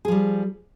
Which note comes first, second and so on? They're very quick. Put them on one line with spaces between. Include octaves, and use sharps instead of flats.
G#4 F3 G3